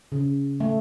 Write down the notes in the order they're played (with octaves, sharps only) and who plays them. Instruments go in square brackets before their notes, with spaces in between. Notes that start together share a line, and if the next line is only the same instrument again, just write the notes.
[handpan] C#3
A3